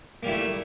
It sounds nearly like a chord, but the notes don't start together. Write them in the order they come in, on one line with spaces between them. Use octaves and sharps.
A#3 G3 E4 A3